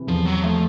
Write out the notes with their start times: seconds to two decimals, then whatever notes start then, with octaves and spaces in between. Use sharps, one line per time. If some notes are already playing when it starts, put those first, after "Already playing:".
Already playing: C3 E3
0.08 E2 F3
0.26 F#3
0.43 F3 A3